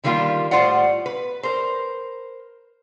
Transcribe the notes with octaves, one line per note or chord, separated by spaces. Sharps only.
D3 D#3 G3 A#3 F4 G4
A2 G3 F4 C5 D5 F#5
B4
A#4 C5